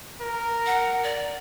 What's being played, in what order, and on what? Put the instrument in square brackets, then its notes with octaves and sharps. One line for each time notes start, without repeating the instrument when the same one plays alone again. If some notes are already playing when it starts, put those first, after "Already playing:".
[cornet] A#4
[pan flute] F#5
D5